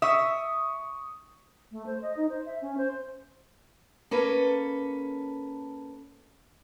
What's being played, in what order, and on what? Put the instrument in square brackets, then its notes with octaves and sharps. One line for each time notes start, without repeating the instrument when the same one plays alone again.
[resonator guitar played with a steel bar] E5 [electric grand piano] C#6 D#6
[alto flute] A3
C5
D#5
D#4
C5
E5
C#4
C5
[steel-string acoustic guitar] A#3 C#4 A4 B4